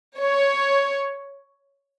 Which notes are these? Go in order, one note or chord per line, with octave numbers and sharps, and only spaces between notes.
C#5